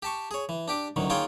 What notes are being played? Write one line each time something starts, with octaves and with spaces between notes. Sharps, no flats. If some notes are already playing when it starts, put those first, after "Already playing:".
G4 A5 C#6
G#4 C#5
E3
D4 G4 D6
A1 D2 D#3 F#3
D#3 A#3 F4 G#4 C#5 G5